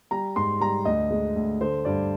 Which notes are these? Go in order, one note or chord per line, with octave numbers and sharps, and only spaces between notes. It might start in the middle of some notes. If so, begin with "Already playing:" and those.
G3 A#5
G#2 C6
G3 A#5
D2 D#5
G#3
D2
D3 C5
G2 D5